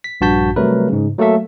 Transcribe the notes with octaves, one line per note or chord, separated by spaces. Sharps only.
B6
A#1 G2 F#4 A5 G6 B6
C3 F#3 G3 A3 A#4 B4
G#2 C#3
F#3 A3 A#3 A4 E5